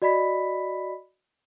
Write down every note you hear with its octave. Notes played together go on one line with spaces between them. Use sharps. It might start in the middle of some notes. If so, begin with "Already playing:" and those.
F#4 D5 D#5 B5 B6